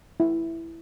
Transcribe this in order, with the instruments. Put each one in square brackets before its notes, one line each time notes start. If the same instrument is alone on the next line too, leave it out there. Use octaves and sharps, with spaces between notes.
[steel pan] E4